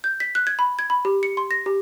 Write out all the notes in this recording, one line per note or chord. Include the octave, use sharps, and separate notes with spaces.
G6
B6
F#6
G#6
B5
G#6
B5
G4
C#7
C6
A#6
G4